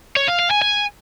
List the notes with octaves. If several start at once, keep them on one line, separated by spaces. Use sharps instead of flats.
C#5
F5
F5
G#5
G#5